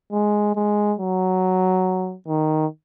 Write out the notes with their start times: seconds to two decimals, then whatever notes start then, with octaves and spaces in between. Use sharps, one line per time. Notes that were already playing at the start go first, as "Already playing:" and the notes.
0.12 G#3
0.55 G#3
0.99 F#3
2.28 D#3